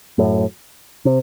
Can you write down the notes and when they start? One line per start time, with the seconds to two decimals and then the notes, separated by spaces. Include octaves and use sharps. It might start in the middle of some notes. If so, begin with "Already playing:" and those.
0.18 F#2 A2
1.05 C3